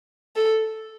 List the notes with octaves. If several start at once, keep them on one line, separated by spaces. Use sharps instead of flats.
A4